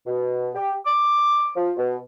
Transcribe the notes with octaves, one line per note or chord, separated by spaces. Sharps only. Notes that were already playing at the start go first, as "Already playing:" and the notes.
B2
G4
D6
F3
B2